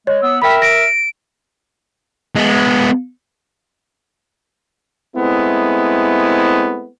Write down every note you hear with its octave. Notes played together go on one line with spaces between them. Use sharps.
G#3 C#5
B3 E6
A#4 E5 G5 B5 B6
A#6 D7
G#3 B3
G#3 A3 B3 C4 E4